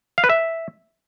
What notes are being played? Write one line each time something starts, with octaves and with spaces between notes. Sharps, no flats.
F5
B4
E5